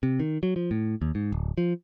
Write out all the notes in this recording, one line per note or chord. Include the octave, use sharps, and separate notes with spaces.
C3
D#3
F#3
F3
A2
D#2
G#2
D1
F3